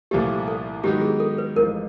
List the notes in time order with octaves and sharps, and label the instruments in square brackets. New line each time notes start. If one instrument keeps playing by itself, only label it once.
[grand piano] C2 A#2 F3 A3 [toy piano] G4
[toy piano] A4
[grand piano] G#2 D#3 F#3 B3 D#4 [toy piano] G4
[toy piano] G#4
A4
B4
[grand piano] A1 G#2 F3 [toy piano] A#4